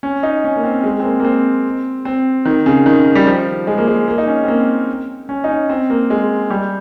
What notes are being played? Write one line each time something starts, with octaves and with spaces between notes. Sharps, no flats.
C#4
D#4
C#4
A#3
C4
G#3
C4
A#3
A#3
C4
C4
D#3
C#3
D#3
G3
F3
G#3
A#3
G#3
A#3
D#4
C#4
C4
A#3
C#4
D#4
C#4
C4
A#3
G#3
G3